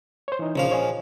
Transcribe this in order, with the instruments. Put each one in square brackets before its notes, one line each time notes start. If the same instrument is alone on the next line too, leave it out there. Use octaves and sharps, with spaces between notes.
[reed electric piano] C5 C#5
E3 D#4
[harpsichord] A#1 F3 F5 [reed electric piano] C#3 C#5
[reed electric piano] C#5 D#5 G#5